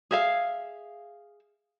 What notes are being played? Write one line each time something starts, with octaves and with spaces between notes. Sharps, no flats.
G#4 E5 F5